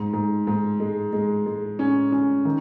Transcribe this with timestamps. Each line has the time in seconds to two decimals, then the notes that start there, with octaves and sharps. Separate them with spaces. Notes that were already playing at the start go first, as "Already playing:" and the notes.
Already playing: G#2
0.13 G#2
0.47 G#2
0.80 G#3
1.13 G#3
1.46 G#3
1.79 C#4
2.12 C#4
2.45 D#3